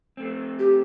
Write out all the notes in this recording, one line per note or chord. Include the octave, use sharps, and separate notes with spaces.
A3 C4
G4